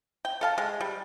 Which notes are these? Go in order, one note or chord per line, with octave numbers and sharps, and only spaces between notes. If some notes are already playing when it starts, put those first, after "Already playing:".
G5
A4 F5 A5
G#3
G3